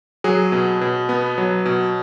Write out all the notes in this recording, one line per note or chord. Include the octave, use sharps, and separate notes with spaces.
F#3 G#4
B2
B2
B3
F#3
B2